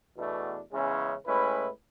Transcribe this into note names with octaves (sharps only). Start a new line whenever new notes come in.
E2 B2 A3 D4
E2 C#3 G#3 C#4 E4
A2 G#3 C#4 E4 B4